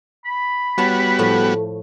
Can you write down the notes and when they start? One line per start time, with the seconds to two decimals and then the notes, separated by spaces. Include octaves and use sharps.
0.25 B5
0.78 G3 B3 F#4 B4 C#5 A5
1.19 A2 F3 A3